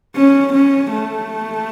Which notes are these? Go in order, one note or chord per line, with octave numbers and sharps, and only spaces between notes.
C#4
C#4
A3